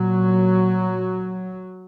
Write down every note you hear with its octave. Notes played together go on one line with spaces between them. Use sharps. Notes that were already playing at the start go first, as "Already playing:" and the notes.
Already playing: A#2 F#3